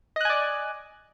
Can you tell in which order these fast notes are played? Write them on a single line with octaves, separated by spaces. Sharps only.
D#5 F#6 G#5 D5